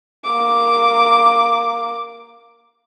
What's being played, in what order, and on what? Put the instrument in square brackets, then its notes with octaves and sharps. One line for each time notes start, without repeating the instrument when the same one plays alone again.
[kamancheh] A#3 D6